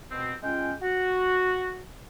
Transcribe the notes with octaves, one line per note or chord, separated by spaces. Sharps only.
B2 C4
G#3 C#4 F4 G5
F#4